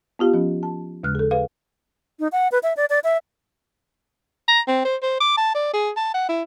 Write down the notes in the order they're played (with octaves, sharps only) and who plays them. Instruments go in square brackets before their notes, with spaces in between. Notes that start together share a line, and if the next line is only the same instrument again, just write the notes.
[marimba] B3 F4 G4 F5
F3 C#4
A5
D#2 C#3 G#3 F6 F#6
G#4 A4
G#4 B4 F5
[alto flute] D#4
F#5
B4
E5
D5
D5
E5
[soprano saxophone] A#5
C4
C5
C5
D6
A5
D5
G#4
A5
F#5
E4